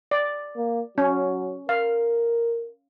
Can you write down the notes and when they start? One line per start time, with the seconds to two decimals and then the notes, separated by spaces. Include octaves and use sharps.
0.11 D5
0.56 A#3
0.98 F#3 C#4
1.69 A#4 F5